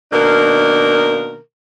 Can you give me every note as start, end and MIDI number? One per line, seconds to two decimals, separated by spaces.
0.12 1.36 47
0.12 1.36 51
0.12 1.36 58
0.12 1.36 62
0.12 1.36 70